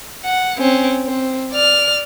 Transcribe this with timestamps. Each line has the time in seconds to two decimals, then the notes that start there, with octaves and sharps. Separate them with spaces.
0.25 F#5
0.58 C4 C#4
1.06 C4
1.52 D5 F6